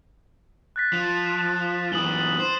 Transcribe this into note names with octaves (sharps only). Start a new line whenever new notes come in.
F#6 A6 B6
F3
F#2 E3 D#6 F#7 G7
C5